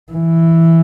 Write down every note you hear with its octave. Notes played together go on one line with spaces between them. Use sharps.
E3